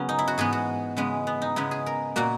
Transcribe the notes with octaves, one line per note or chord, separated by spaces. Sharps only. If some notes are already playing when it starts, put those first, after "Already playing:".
Already playing: C#3 F#3 B3 C#4 A#4
D#4
E4
F#4
G#2 E3 B3 G#4
F#4
C#3 E3 G#3 B3
B3
D#4
C#3 G#3 B3 E4
G#4
A#4
A#2 A#3 F#4